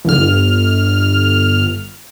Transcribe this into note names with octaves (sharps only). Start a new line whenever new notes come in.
G1 F6